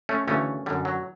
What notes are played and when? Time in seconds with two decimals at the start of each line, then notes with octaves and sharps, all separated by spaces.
0.09 A3 C#4
0.27 D2 C#3 E3 A3 C#4
0.66 F#2 D3 G3
0.85 F#3